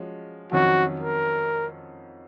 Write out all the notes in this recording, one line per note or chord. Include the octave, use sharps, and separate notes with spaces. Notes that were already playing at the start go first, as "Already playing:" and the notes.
Already playing: F3 G#3 C#4 F#4
F2 D#3 F#3 C#4 F#4
A#4